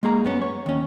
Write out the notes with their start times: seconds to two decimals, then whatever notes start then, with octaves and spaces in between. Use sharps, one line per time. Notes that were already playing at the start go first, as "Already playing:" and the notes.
0.03 G#3 A#3 G#4 A#5
0.24 F#2 B3 C#4
0.42 C#5
0.66 D#2 C#4